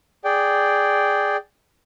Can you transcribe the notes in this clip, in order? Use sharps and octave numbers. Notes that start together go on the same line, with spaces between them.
G#4 D5 G5